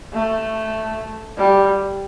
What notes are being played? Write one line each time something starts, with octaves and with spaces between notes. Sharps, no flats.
A3
G3